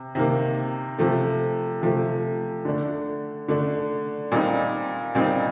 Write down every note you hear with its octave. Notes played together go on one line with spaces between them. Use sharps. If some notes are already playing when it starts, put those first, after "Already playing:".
Already playing: C3
C3 D#3 A#3
C3 F3 A3
C3 F3 A3
D3 A3 D4
D3 A3 D4
A#2 G3 C4 D#4
A#2 G3 C4 D#4